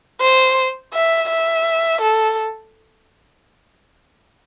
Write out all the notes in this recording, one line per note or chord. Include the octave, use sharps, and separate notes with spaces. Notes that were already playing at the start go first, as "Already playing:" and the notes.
C5
E5
E5
A4